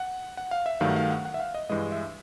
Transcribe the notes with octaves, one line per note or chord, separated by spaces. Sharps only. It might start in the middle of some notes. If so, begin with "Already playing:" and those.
Already playing: F#5
F#5
F5
E5
G2 D#3 F#3 A3 F5
F#5
F5
F#5
F#5
E5
F5
D#5
G2 E3 G#3 D#5
E5